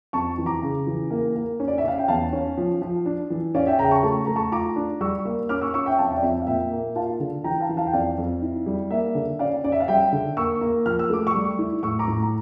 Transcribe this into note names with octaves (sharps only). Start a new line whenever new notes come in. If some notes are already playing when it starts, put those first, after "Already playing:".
F2 A5 C#6
E3
A#5 D6
C#3
E3
A#3
A#3
C#4
D5
E5
C#4 F5
G5
E2 F5 A5
C#4
F3
F3
D4
E3
C#4 D5 F5
E5 G5
C#3 G5 A#5
A5 C#6
A3 A5 C#6
A3 A#5
A5 C#6
F4 A#5 D6
D4
G3 C#6 E6
A#3
C#4 D6 F6
C#6 E6
C#4 C#6 E6
E5 G5
F2 F5 A5
E5 G5
D5
F2 E5
E5
F5
A#2 E5 G5
A#3
F4 F5 A5
D3
E3 G5 A#5
F5 A5
E3
F5 A5
G5
F2 D5 F5
F2
E4
G3
A#3 E5
D3
C#4 D5 F5
C#4 D5
E5
F5
G3 E5 G5
D3
A#3 C#6 E6
A#3
F3 F6
E6
A3 D6
C#6 E6
G3
E4
A2 C#6 E6
A#5 D6
A2
A#5